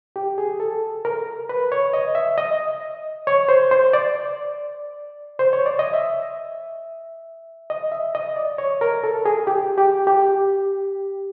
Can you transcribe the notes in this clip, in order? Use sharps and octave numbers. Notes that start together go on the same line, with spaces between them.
G4
G#4
A4
A#4
B4
C#5
D#5
E5
D#5
C#5
C5
C5
D5
C5
C#5
D5
D#5
E5
D#5
E5
D#5
D5
C#5
A#4
A4
G#4
G4
G4
G4